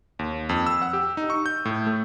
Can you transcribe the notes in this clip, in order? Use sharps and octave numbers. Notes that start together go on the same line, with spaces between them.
D#2
F2
E6
F#5
G4
D#4
C#6
G6
A2
A3